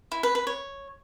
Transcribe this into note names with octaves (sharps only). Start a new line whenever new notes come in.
E4
B4
B4
C#5